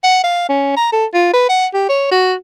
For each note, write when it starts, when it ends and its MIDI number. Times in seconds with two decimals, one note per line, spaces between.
0.04 0.23 78
0.24 0.49 77
0.49 0.77 61
0.77 0.88 82
0.92 1.06 69
1.14 1.31 65
1.34 1.47 71
1.49 1.67 78
1.74 1.86 67
1.89 2.07 73
2.11 2.34 66